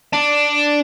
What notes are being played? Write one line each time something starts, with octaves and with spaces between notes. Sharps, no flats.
D4